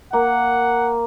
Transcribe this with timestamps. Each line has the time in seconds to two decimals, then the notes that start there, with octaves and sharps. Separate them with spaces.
0.13 A#3 F#5